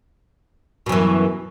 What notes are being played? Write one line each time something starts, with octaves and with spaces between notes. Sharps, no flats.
F#2 B2 E3